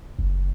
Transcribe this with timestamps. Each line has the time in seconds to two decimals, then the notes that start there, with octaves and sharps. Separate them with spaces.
0.19 F#1